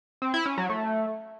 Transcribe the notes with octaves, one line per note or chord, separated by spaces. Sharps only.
C4
E4
C#4
F#3
A3